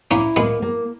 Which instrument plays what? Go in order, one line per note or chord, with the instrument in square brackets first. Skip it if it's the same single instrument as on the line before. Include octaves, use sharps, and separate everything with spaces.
[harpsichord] A#3 C#4 [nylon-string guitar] E4
[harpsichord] G#3 B3 [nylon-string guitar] A#3
[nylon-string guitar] A#3